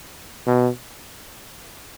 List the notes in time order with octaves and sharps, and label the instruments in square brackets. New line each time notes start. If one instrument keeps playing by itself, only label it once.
[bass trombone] B2